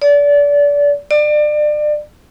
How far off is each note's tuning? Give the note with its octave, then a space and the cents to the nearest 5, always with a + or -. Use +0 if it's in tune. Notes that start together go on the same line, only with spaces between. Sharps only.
D5 -25
D5 +30